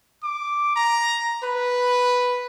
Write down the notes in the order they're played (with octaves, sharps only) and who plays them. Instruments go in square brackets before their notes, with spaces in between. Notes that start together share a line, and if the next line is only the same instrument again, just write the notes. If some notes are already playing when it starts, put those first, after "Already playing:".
[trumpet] D6
A#5
B4